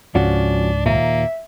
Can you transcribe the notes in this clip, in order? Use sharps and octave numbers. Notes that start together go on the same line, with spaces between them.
C#2 G#2 F3 C#4 D4 F#4
D#2 A#2 A#3 E5